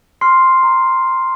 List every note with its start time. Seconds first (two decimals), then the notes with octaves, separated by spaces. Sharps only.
0.21 C6 F6 C7
0.63 A#5